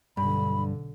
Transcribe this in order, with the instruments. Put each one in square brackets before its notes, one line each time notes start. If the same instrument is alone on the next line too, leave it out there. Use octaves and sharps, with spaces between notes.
[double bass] B1 D3 [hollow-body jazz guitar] G2 [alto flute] B5